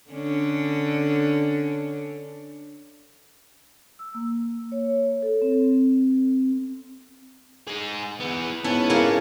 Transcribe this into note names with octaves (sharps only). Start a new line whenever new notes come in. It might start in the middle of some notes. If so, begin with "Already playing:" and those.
D3 C#4 D4
E6
A#3
C#5
A4
C4
D#4 G#4
E3 B3
G#2 B3 C#4 E4 A5
C#3 A#3 E4